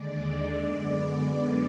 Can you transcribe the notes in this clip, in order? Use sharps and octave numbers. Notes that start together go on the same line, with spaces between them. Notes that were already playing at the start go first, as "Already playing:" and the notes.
Already playing: D#2 D3 G#3 D5
F#2 D3 G#3 B3